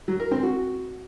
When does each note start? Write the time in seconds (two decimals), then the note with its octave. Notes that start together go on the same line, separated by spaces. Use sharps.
0.08 F#3
0.20 A#4
0.31 C4
0.43 F#4